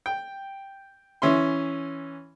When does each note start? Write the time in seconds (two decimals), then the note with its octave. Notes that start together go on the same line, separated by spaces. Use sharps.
0.06 G5
1.22 E3 C#4 E5 C6